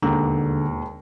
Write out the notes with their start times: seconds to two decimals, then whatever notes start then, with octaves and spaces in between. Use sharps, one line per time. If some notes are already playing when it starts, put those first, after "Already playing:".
0.02 E1 D#2 D3 A#5